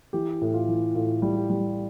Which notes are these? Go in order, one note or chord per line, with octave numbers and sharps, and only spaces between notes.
E3 G4
A2
F4
E3
A2 F4
G3
G4
G3